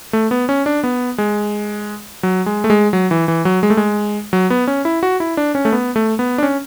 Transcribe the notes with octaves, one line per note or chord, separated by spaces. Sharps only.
A3
B3
C#4
D4
B3
G#3
F#3
G#3
A3
G#3
F#3
E3
E3
F#3
G#3
A3
G#3
F#3
B3
C#4
E4
F#4
E4
D4
C#4
A3
B3
A3
B3
D4
C#4